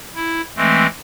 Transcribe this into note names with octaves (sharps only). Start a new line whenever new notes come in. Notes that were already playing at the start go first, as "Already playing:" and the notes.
E4
E3 G#3 A3 C4